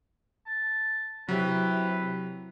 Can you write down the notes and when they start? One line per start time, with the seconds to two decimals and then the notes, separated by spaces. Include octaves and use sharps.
0.46 A5
1.29 C3 F#3 E4 G4 B4